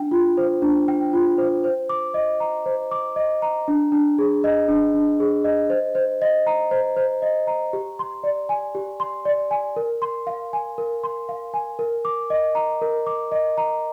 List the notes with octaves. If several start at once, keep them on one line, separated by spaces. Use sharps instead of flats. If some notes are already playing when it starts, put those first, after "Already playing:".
Already playing: D4 G5
F4
C5
D4
G5
F4
C5
C5
D6
D#5
A#5
C5
D6
D#5
A#5
D4
D4
G#4
D#5
D4
D4
G#4
D#5
C5
C5
D#5
A#5
C5
C5
D#5
A#5
G4
C6
D5
G#5
G4
C6
D5
G#5
A#4
C6
F5
G#5
A#4
C6
F5
G#5
A#4
D6
D#5
A#5
A#4
D6
D#5
A#5